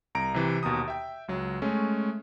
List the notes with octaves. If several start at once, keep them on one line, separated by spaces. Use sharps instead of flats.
C2 A#5 D7
C3 E3
D#2 B2 A#5 D#6
E5 G5
C#2 F#3
G#3 A3 C#4